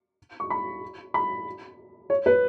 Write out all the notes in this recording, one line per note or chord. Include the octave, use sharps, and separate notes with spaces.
C#6
B5
B5
C#5
B4